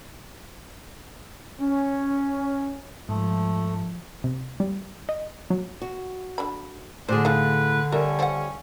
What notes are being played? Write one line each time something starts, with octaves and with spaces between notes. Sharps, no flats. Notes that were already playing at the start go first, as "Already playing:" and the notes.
C#4
G#2 F3 A3
C3
G3
D#5
F#3
F#4
D3 D4 B5
A2 D3 D4 G#4 C5
D#4 A4 B4 F5
G3 C#4 A#4 E5
F3 F#5